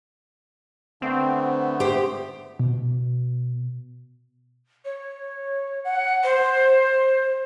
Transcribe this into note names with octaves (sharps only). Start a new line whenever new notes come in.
D3 A3 B3 C4
G4 C5
B2
C#5
F#5
C5